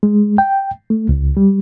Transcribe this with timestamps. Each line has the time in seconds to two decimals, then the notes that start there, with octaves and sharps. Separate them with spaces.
0.03 G#3
0.38 G5
0.90 A3
1.09 C#2
1.37 G3